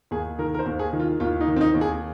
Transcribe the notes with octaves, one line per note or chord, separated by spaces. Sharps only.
D#2 G#4
D#3 A#4
A#4
C5
D#2
G#4
D#3
F4
D#2 F4
D#4
D#3
C4
D#4
D#2
G#4